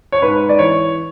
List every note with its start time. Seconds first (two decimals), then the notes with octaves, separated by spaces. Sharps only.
0.12 C#5
0.22 G#2 B4
0.49 D5
0.59 E3 C#5